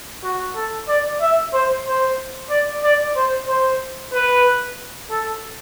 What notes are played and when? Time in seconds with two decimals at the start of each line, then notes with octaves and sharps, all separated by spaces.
0.23 F#4
0.55 A4
0.88 D5
1.21 E5
1.53 C5
1.86 C5
2.50 D5
2.84 D5
3.16 C5
3.48 C5
4.13 B4
5.11 A4